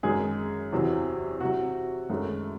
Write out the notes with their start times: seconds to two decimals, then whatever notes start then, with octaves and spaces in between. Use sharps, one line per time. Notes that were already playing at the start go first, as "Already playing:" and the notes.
0.03 F#2 D#3 G#3 G#4
0.72 E2 C3 F#3
1.40 C3 F#3 F#4
2.10 F#2 D#3 G#3 A3